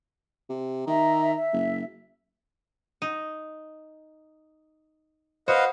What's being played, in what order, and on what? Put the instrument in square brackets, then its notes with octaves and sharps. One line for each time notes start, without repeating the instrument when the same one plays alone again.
[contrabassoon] C3
[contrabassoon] D#3 [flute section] E5 A#5
[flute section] E5
[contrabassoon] F#1
[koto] D#4
[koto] F#4 [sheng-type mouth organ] B4 D#5 F5 [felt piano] C5